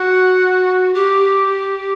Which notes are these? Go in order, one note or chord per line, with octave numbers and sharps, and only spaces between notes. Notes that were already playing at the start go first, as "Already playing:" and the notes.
Already playing: F#4 F#5
G4